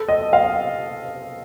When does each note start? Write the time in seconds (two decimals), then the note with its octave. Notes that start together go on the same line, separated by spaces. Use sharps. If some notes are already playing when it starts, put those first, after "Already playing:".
Already playing: A4
0.08 D#5
0.33 F5